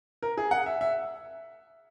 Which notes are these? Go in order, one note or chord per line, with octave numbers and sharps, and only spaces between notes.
A#4
G#4
F#5
E5
E5